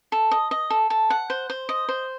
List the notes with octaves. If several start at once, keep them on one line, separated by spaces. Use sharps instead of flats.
A4
D#5
D#5
A4
A4
F#5
C5
C5
D#5
C5